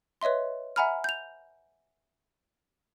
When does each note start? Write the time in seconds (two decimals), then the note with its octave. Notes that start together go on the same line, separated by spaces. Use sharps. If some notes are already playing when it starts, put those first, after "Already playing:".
0.22 B4 C#5 D#5 E5 C6
0.76 E5 F#5 G#5 A#5 B5 F6
1.04 G6 F7